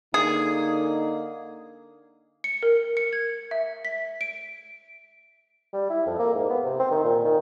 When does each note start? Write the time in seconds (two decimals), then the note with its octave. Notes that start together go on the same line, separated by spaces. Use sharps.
0.14 D3 A#3 D#4 G#4
2.44 C#7
2.63 A#4
2.97 C#7
3.13 G#6
3.51 E5
3.85 B6
4.21 D7
5.73 G3
5.90 E4
6.06 F2
6.19 A#3
6.35 G#2
6.50 B3
6.64 C3
6.79 C4
6.91 D#3
7.04 A#2
7.24 D#3